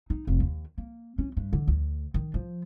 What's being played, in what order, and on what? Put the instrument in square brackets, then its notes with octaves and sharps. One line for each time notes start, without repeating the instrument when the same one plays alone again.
[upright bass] D#4
F1
D#2
A#3
C#4
G2
D3
D2
D#3
F3